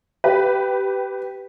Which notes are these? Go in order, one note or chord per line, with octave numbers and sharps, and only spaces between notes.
G4 B4